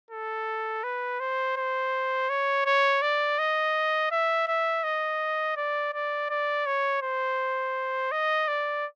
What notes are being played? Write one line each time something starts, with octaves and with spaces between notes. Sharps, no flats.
A4
B4
C5
C5
C#5
C#5
D5
D#5
E5
E5
D#5
D5
D5
D5
C#5
C5
D#5
D5